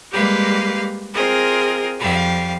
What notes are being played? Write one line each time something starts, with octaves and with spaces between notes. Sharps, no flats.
G3 G#3 A#3 G4 B4 F5
C4 F4 G#4 A#4 D#5
F2 G3 F5